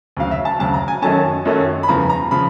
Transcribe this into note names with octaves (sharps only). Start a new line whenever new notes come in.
D2 C#3 F#3 F5
E5
A5
D2 C#3 F#3 A5
A#5
G#5
F#2 D#3 F#3 A3 C#4 A5
F#2 D#3 F#3 A3 C#4
B5
E2 C#3 F3 A#5
A#5
C#3 F3 B5